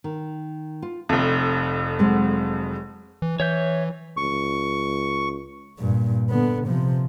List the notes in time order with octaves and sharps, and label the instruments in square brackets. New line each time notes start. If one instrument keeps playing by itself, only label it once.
[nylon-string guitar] D#3
F4
[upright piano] F1 F2 [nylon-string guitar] E5
[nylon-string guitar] F#3 G#3 C4
[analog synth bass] E3
[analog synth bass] E3 [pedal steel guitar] C#5 E5 G6
[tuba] C#2 [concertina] C#6
[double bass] G2 A#2
D3 B3
C3 F3